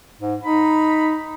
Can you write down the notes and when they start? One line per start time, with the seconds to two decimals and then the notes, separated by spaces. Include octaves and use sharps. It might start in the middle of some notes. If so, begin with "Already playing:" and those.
0.20 G#2
0.43 D#4 B5